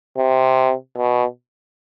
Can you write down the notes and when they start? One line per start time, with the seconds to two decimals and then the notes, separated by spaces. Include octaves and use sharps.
0.18 C3
0.96 B2